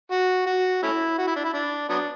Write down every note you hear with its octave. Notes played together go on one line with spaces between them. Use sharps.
F#4
F#4
A3 C#4 E4
F#4
E4
D4
E4
D4
F#3 B3 D4